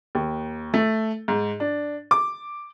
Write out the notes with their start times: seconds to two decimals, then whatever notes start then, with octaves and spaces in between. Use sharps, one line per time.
0.15 D#2
0.74 A3
1.28 G#2
1.60 D4
2.11 D6